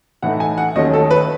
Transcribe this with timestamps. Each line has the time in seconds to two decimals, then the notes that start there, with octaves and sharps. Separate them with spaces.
0.22 A2 E3 A3 D#4 F#5
0.40 G#5
0.58 F#5
0.76 D#2 D#3 F#3 A3 C#4 D#5
0.94 A4
1.11 B4